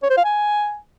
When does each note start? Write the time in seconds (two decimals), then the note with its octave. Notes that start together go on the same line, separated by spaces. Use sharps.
0.03 C#5
0.10 C5
0.17 F5
0.25 G#5